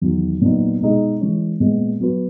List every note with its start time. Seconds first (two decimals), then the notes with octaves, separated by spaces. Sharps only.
0.01 E2 D#3 F#3
0.41 A#2 F#3 B3 D#4
0.81 B2 G#3 D#4 G#4
1.21 E3 G#3 C#4
1.60 A#2 G#3 B3
2.00 F#3 B3 F#4 B4